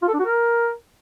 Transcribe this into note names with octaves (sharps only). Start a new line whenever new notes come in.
F4
A4
D4
F#4
A#4